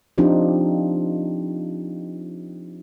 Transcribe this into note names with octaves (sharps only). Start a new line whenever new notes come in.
F3 C4 D4 D#4 F4 G4